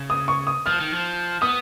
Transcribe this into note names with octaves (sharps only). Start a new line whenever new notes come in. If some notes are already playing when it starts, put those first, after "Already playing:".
Already playing: C#3
D#6
C#6
D#6
F3 F6
D#3
F3
B3 D#6